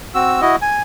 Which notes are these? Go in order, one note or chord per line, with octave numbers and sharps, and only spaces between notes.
C4 F#4 E6
E4 F#4 D#5
G#5